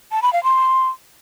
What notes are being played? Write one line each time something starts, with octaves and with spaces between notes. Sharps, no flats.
A5
B5
F5
C6